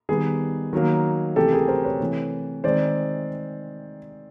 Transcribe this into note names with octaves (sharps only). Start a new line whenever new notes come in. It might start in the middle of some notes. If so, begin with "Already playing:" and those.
D#3 G3 B3 G#4
D#3 F#3 A#3
C3 E3 A3 C#4 G4 A4
G#4 A#4
A#4 C5
B4 C#5
C3 E3 A3
D#3 G#3 C4 C5 D5